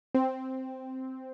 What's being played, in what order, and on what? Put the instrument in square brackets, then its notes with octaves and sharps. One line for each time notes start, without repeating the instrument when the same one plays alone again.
[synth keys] C4